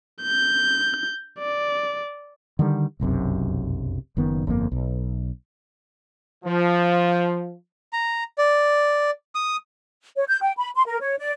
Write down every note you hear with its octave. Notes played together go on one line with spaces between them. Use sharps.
G6
D5
D3 D#3 G3
F1 B1 F#2 C3
F#1 F#2 D#3 B3
G1 F2 D3 A#3
B1
F3
A#5
D5
D#6
C#5
G6
G5
B5
C6
A#4
C#5
D5